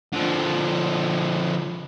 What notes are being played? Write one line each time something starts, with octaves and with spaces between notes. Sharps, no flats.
D3 F3